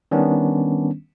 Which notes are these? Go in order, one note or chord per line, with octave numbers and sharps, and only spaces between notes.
D#3 G3 B3 C#4 D4